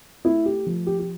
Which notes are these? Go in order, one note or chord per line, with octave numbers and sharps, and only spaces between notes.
A3 E4
G4
F3
G4
G4